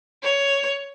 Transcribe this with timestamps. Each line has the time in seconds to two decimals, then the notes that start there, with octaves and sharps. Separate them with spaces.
0.23 C#5